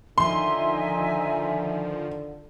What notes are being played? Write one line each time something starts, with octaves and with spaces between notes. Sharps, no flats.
D3 D#3 F3 D#4 E5 G#5 C6